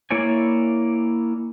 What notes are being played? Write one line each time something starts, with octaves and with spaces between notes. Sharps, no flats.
A#3 E4 C#5 D5 G#5